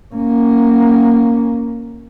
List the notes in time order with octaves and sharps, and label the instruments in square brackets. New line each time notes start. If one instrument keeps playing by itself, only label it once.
[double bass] A#3 C#4